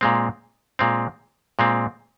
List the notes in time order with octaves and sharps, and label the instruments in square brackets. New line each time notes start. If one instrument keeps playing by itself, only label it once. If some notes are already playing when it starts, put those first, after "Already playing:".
[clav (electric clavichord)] A#2 G#3 C4
A#2 G#3 C4
A#2 G#3 C4